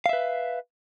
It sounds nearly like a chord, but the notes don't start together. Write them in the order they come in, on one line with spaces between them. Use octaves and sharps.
F5 E5 B4